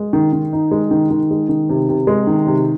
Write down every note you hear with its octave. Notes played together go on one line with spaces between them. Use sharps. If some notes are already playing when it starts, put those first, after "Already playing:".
Already playing: G#3
D#3
D#3
D#4
G#3
D#3
D#3
G#3
D#3
C3
C3
G#3
D#3
C3